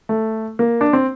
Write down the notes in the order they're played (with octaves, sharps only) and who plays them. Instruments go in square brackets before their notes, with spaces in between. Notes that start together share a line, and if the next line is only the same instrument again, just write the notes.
[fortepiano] A3
A#3
D4
C4